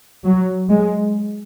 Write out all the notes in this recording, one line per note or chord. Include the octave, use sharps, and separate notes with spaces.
F#3
G#3